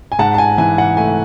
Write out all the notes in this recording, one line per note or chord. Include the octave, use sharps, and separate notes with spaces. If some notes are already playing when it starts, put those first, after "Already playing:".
G#5
G#2 F#5 A5
A5
G#5
E3 G#5
F#5
A3 G#5